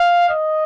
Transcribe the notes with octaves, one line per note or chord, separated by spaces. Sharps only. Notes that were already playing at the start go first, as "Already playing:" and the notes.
Already playing: F5
D#5